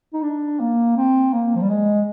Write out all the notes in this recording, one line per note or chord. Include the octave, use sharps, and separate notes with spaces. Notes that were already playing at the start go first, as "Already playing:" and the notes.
D#4
D4
A#3
C4
A#3
F3
G3
G#3